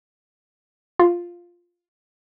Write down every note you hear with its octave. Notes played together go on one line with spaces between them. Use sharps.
F4